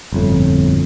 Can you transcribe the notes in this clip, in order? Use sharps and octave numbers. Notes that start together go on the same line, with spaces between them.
G1 F2 A2